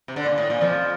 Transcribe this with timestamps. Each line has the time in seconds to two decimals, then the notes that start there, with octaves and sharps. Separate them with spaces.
0.08 C3
0.16 D3
0.26 A#2
0.38 A2
0.50 A#2
0.61 F2 F3